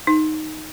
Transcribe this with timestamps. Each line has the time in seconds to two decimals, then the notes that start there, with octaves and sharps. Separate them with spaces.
0.07 D#4